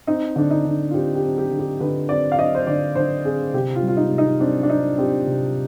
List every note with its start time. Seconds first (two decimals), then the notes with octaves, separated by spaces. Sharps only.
0.07 C4 D#4
0.36 D3 D4
0.51 D#4
0.65 D3
0.90 F4
0.94 C4 G4
1.15 G4
1.23 C4
1.38 G4
1.51 D3
1.59 G4
1.80 D3 B4
2.09 C4 D5
2.32 F5
2.38 C4 D#5
2.55 C5
2.67 D3 D5
2.95 D3 C5
3.24 C4 G#4
3.54 C3 G4
3.75 F4
3.83 G3
3.88 F4
3.97 D#4
4.11 C3
4.18 D#4
4.40 C4 D4
4.63 D4
4.69 C4 D#4
4.98 C4 G4
5.27 C3